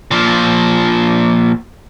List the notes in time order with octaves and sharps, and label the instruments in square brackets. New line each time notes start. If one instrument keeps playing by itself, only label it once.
[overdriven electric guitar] A#2 F3